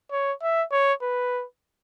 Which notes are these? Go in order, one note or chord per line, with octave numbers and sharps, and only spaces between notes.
C#5
E5
C#5
B4